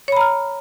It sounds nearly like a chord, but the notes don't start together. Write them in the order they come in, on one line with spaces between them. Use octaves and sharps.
C#5 B5 A#5 F6